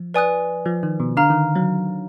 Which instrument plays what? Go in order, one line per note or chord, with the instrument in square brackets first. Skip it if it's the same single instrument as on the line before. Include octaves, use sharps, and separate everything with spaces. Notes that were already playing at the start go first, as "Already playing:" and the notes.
Already playing: [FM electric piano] F3
[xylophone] B4 D5 G#5 D#6 F#6
[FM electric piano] F3
D#3
B2
[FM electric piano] D3 [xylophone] F5 A#5 F6
[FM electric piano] D#3
F#3